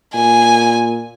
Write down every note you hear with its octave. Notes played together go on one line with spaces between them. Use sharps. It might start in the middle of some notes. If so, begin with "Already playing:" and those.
A#2 G#5